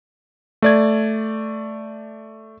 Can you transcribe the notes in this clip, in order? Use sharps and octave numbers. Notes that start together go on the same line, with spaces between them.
A3 D5 G#6